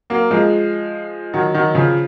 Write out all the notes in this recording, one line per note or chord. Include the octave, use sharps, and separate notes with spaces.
F#3 A#3
F3 G#3
D#3 F#3
D#3 F#3
C#3 F3